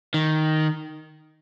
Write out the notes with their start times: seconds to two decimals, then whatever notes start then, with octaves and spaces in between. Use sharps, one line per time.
0.14 D#3